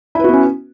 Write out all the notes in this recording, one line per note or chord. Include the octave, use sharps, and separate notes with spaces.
B3 C#4 E4 F#4 B4